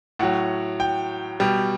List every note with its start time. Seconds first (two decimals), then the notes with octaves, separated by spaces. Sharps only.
0.19 A2 F#3 F#5
0.80 G5
1.40 B2 G3